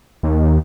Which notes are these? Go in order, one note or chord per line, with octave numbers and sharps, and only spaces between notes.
D#2